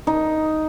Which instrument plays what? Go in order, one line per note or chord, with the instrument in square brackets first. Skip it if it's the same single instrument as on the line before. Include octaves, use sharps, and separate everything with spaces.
[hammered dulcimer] D#4